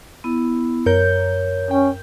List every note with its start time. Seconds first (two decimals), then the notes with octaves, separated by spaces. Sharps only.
0.24 B3 E4
0.86 F#2 A#4 C#5 G6
1.71 C#4 G5